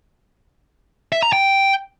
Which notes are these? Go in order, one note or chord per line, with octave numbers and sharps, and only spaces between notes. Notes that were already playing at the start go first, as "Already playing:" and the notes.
E5
A#5
G5